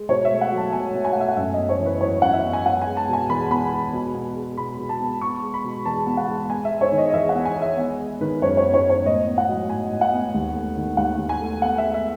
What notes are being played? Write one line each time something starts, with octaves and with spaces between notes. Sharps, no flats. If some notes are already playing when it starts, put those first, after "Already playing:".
Already playing: G#3
B2 C#5
E5
A3
F#5
F#3
A5
B2 G#5
B2
G#5
F#5
A3 E5
F#5
F#2 E5
B3 D#5
C#5
E3
B4
F#2 C#5
F#2 F#5
E5
B3
G#5
B3 F#5
G#5
G#3
A5
B2 G#5
E2 B5
B3 B5
G#3
B2
B3
G#3
B2 B5
B2
A5
B3
B3 C#6
G#3
B5
B2
E2 A5
B3
F#5
G#3
B3 G#5
E5
G#3
C#5
D#3
D#5
D#5
E2 E5
F#5
B3
G#5
G#3 E5
B3
G#3
D#3 B4
F#2 C#5
C#5
B3
C#5
G#3
C#5
A2 D#5
B3
F#5
F#3
A2 G#5
A2
F#5
B3
D#2
A3
D#3
D#2 F#5
D#2
G#5
A3
B3 F#5
E5
G#3
E5